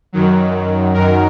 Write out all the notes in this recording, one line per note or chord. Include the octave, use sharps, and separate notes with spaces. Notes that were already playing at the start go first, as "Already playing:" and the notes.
F#2 D#3 F#3
F#2 D#3 F#3 A#4